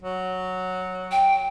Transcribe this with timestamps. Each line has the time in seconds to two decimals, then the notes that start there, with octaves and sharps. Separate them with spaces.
0.03 F#3
1.12 G5